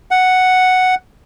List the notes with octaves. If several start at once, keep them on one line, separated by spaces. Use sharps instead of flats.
F#5